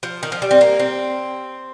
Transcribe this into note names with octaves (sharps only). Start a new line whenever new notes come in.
F3
D#3
F3
G3
C4
A#3
C4